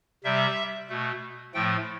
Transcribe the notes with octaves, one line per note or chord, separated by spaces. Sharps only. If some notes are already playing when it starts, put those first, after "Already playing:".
C3 G3 E5
B2 A3
A2 F3 A3 G5